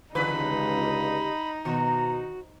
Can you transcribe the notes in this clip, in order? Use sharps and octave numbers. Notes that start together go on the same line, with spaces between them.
C#2 G2 D3 D#4 B4 B5
B2 D#3 F#4 A#5